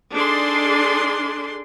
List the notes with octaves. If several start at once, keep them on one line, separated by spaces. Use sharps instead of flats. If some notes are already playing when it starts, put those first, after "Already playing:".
D4 D#4 G#4 A4 D5 C6